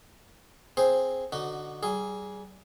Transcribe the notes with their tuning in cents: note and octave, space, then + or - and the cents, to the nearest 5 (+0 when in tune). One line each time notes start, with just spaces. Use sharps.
C4 +0 G#4 +0 C5 +0
D3 +0 D#4 -20 F#4 +5
G3 -30 G#4 +0